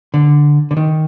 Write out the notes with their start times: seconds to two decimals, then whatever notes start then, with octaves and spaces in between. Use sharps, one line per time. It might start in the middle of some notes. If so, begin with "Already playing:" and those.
0.14 D3
0.71 D3
0.77 D#3